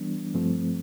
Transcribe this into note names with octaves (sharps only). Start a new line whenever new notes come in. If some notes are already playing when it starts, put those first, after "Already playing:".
Already playing: E3 G3 B3 D4
G2 F3 A3 C4